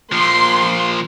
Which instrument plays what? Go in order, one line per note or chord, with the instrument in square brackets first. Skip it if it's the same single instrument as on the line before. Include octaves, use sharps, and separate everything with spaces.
[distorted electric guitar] A#2 F3 [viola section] C6